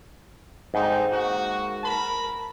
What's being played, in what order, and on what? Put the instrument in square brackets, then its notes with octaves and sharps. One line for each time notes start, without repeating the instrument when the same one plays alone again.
[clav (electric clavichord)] G#2 [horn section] D3 C4 D#4
[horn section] A#3 F#4
A#4 A5 B5